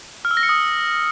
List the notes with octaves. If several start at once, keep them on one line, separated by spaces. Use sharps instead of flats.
F6
E6
A#6
C#7
D#6